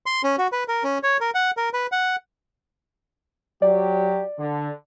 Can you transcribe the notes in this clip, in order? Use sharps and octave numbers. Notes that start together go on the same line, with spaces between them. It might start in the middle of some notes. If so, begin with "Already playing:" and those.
C6
C#4
F#4
B4
A#4
C#4
C#5
A#4
F#5
A#4
B4
F#5
F#3 G4 D5
D3